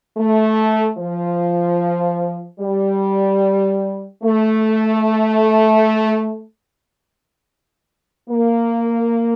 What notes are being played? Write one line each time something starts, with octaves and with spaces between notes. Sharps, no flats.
A3
F3
G3
A3
A#3